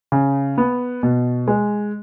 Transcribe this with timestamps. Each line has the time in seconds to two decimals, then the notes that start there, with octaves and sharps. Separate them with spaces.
0.12 C#3
0.58 B3
1.03 B2
1.48 G#3